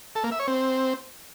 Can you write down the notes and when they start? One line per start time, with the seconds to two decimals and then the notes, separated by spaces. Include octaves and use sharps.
0.16 A4
0.24 A#3
0.32 E5
0.40 C#5
0.48 C4